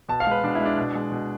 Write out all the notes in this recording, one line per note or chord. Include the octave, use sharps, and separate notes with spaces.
B2 A5
F5
G#3 B4
B2 D4
G#3 E4
D4
B2
G#3
B2